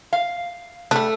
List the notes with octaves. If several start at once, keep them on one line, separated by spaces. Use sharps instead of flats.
F5
G3 A3 D4